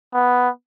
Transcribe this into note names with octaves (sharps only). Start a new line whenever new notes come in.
B3